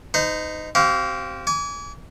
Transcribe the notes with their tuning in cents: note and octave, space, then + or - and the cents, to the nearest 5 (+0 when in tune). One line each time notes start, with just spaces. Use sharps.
D#4 -5 C5 -45
C4 +0 G4 -45 F5 +0
G#5 +5 D6 -40